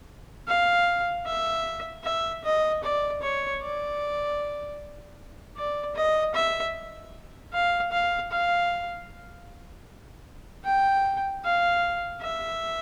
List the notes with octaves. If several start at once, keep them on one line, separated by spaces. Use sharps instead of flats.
F5
E5
E5
D#5
D5
C#5
D5
D5
D#5
E5
F5
F5
F5
G5
F5
E5